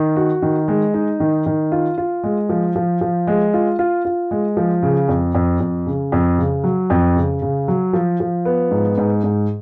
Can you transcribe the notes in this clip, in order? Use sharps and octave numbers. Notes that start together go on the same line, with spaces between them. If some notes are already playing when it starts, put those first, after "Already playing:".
Already playing: D#3
F#4
D#3
G#3
D#4
D#3
D#3
F4
F4
G#3
F3
F3
F3
G#3
F4
F4
F4
G#3
F3
C#3
F2
F2
F2
C#3
F2
C#3
F#3
F2
C#3
C#3
F#3
F3
F3
B3
G#2
G#2
G#2